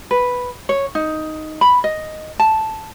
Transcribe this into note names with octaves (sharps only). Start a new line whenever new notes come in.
B4
C#5
D#4
B5
D#5
A5